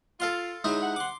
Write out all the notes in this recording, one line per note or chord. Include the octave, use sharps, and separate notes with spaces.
F4 A4 F5 C6
E2 G#2 F#3 G#3 D#4 E4
C3 F#5
C6 D6